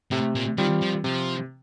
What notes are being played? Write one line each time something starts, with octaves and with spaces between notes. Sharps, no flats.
A2 C3
A#2
D#3 G3 C4 F4
F3
C3 F3